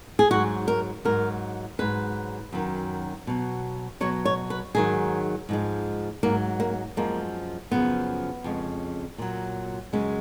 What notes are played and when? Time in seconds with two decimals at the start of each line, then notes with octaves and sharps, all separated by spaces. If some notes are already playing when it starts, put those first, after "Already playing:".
0.19 G#4
0.31 G#2 F#3 F#4
0.68 A#4
1.05 G#2 F#3 A#4
1.79 G#2 F#3 B4
2.53 F#2 D#3 F#3
3.27 B2 F#3
4.01 B2 F#3 C#5
4.25 C#5
4.50 B4
4.75 G#2 D#3 F#3 G#4
5.49 G#2 F3 G#3
6.23 G#2 F#3 A#3
6.60 A#3
6.97 F#2 F3 G#3 A#3
7.71 F#2 C#3 F3 B3
8.44 F2 C#3 G#3
9.18 A#2 F#3
9.93 F#2 C#3 G#3